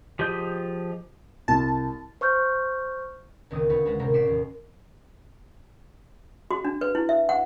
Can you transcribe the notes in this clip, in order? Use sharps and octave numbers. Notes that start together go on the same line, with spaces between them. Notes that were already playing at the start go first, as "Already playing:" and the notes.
F3 G4 G#4 D#5 G6
C2 A5
C5 C#6 F6 G6
C#2 A#2 D#3 C4 D#6
D2 F4 B4 C#6
G#3 F4 F#4 B4
A2 C3 C#4 A#4 C5 A#5
A1 D5 C#6 B6 C7 E7
D#2
F#4
D4
B4
E4
E5
F#5